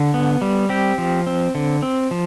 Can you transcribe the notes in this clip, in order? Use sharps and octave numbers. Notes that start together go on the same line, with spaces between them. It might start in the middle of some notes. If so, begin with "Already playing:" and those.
Already playing: D3
B3
G3
C4 G4
F3
C4
D3
C4
F3